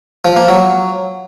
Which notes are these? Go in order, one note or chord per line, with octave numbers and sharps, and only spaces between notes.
F3
A#3
F#3